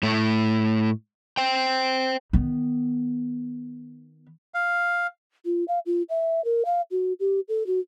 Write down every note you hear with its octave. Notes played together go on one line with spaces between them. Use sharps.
A2 A3
C5 G5
D#3 B3
F5
F4
F5
F4
E5
A#4
F5
F#4
G4
A4
F#4